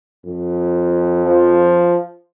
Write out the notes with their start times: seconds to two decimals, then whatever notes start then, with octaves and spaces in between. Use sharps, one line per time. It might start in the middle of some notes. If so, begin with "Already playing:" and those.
0.25 F2
1.24 F3